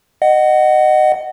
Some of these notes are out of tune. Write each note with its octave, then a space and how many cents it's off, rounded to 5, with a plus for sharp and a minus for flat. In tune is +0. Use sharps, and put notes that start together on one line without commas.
D#5 -20 F#5 +15